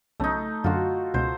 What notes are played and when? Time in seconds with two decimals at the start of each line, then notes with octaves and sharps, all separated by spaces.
0.20 B1 C#3 A3 D#4
0.64 F#2 D3 F4 F#4
1.14 C#2 B2 C5